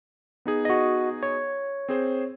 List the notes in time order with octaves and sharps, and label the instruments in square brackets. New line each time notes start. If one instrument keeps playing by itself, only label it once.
[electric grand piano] B3 D#4 G#4
[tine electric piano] F#4 D#5
C#5
[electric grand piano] C4 G#4 C5